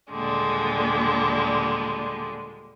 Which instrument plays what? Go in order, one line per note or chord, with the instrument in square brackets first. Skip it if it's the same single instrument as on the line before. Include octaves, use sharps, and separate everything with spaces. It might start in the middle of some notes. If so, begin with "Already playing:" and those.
[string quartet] D#2 A#2 D3 G3 G#3